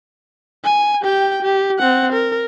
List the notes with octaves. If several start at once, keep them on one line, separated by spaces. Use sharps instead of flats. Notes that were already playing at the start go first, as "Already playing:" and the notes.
G#5
G4 G5
G4
C4 F#5
A#4